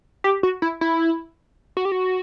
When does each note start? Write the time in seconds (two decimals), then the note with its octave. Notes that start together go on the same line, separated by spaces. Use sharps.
0.24 G4
0.43 F#4
0.62 E4
0.81 E4
1.77 F#4
1.85 G4
1.92 F#4